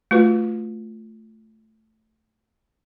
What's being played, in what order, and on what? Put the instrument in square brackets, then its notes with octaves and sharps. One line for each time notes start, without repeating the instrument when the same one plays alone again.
[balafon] A3 F4 F#4 B4